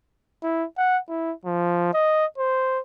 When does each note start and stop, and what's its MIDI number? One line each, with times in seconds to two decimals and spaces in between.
0.43 0.65 64
0.77 0.99 78
1.09 1.33 64
1.45 1.90 53
1.93 2.25 75
2.38 2.79 72